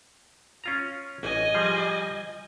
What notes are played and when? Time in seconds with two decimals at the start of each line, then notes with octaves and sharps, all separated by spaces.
0.64 C#4 F4 A#5
1.23 A1 D#5 G#5
1.54 F3 G3 G#4